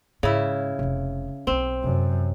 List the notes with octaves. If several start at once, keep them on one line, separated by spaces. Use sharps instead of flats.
G#2 C#3 E4
F1 C3
B1 B3 C4
F#2 C3 E3